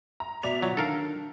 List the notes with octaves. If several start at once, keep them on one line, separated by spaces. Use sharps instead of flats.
A#5
B2 D5 E5 F7
F#3 F4
D#3 D4 A4 A#4 F5